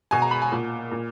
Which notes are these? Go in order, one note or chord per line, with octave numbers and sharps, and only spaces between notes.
B2 G#5
A#5
B5
G#5
A#2
A#2